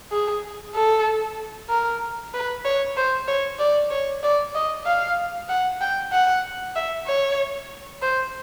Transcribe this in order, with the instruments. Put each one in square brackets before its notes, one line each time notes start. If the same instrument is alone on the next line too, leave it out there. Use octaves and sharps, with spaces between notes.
[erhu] G#4
A4
A#4
B4
C#5
C5
C#5
D5
C#5
D5
D#5
F5
F#5
G5
F#5
E5
C#5
C5